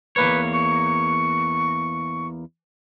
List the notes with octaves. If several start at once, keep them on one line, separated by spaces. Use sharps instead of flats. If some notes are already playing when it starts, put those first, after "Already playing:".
E2 A#3 B4 C#5
C#6